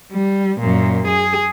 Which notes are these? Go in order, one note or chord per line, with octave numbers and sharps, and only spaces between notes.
G3
F#2 A#2
G#4